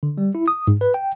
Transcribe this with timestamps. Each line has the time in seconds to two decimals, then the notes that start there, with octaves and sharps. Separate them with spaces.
0.03 D3
0.18 G3
0.35 E4
0.48 D#6
0.68 G#2
0.81 B4
0.94 G5